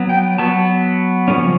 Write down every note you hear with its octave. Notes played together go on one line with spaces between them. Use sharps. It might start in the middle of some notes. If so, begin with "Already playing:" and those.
Already playing: F#3 B3
G5
F#3 B3 A5
C#3 F3 A3 C#4